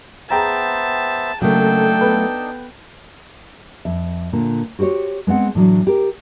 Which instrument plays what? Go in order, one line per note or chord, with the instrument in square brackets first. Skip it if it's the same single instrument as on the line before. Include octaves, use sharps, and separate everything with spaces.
[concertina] B3 C5 E5 [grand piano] G#4 G5 A#5 [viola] A5
[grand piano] C#3 A#3 [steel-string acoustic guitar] F#3 A3 [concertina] D4 D#4 [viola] A4 G5
[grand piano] B3 B4
[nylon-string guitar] F2 E5
A#2 D3
F#4 G4 A#4 C5 C#5
G#3 B3 C4 F#5
A2 E3 F#3 D4
G4 A#4